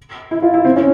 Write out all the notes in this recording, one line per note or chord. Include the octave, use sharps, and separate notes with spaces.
E4
F4
E4
C4
C#4